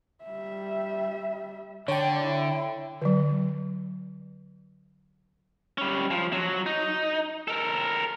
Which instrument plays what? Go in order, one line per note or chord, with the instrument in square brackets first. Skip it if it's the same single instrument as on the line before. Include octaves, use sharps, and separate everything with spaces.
[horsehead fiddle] G3 E5
[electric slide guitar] D3 [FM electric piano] C#5 G5 [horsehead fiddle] D5
[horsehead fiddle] E4
[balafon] D3 F#3
[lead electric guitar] G3 C#4
F3
F#3
D#4
A4 A#4